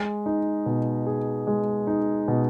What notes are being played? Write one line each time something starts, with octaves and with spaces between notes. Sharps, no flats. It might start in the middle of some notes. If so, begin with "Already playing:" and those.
Already playing: G#3
D#4
B2
G#4
G#3
D#4
B2